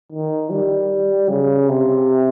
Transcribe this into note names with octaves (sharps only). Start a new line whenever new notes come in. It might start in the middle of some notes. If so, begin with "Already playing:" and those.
D#3
G3
C#3
C3